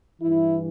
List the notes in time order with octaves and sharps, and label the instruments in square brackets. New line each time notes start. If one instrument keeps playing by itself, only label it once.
[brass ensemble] G2 E3 E4